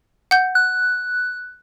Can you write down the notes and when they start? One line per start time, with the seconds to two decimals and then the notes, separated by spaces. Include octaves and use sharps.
0.31 F#5 G6
0.55 F#6